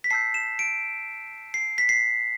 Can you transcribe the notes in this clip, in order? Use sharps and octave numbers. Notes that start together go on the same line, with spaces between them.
B6
A5 E6 G6 C7
E7
D7
C7
B6
C7